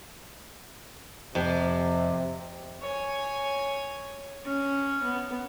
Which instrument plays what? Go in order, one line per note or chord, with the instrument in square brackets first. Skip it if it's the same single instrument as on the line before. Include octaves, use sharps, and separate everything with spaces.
[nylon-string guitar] F2 [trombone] C3
[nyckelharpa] C#5 G#5
C#4
B3